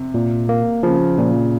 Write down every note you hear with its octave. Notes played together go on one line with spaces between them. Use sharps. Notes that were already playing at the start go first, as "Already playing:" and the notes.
Already playing: C3
A#2
A#3
C#3 F3
A#2